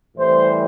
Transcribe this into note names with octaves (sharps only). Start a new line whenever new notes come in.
A2 E3 G3 C4 C5